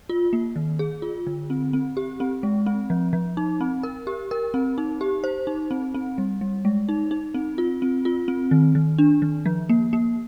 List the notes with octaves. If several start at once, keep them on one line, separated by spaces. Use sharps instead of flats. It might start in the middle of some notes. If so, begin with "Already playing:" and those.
F4
A#3
D#3
G#4
F4
D3
C4
C4
G4
C4
G#3
C4
F3
F3
D#4
C4
A#4
G4
A#4
C4
D#4
G4
C5
D#4
C4
C4
G3
G3
G#3
D#4
D#4
C4
F4
C4
F4
C4
D#3
D#3
D4
D#3
F3
A#3
A#3